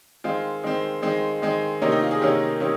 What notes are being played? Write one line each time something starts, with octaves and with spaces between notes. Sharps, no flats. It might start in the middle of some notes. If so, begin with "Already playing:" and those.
D#3 G#3 C4 F4
D#3 G#3 C4
D#3 G#3 C4
D#3 G#3 C4
C3 D#3 A#3 C#4 D#4
D#4
F4
G#4
C3 D#3 A#3 C#4
C3 D#3 A#3 C#4